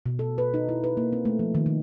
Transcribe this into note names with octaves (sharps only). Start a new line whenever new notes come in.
B2
A4
B4
D#4
E4
B4
A#3
C4
A3
F3
D#3
D#3